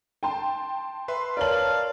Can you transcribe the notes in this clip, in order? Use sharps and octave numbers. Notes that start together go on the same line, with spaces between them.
G5 A5 C6
B4 E5 C6
A#4 C#5 D5 F5 A5 F#7